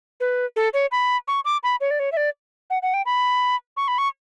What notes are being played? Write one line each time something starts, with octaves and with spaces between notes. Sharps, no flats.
B4
A4
C#5
B5
C#6
D6
B5
C#5
D5
C#5
E5
D5
F#5
F#5
G5
B5
C#6
B5
C#6